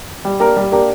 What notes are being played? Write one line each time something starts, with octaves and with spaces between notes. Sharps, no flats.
G3
A#3 D4 G4 A#4
G3
A#3 D4 G4 A#4